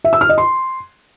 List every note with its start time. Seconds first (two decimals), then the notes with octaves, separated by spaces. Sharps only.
0.04 E5
0.13 E6
0.21 F6
0.29 D#5
0.38 C6